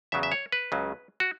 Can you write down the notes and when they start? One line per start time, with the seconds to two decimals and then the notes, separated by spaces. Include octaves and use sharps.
0.12 E2 C#3 F#3 E5
0.23 E5
0.32 C#5
0.52 B4
0.72 C#2 C#3 F#3
1.20 F#4